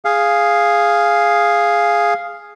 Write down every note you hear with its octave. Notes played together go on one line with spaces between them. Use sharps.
G#4 F5